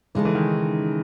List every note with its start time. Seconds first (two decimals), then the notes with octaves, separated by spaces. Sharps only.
0.15 C#3 E3 G#3 D#4 A4
0.25 E3
0.35 D#3